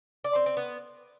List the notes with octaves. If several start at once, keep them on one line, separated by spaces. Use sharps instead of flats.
D5
C4
C4
B3